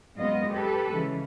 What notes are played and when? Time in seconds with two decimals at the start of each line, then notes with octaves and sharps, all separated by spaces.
0.16 F#2 G#3 B3 F4 D#5
0.50 G4 A4 B4
0.90 C#3 E3 G#3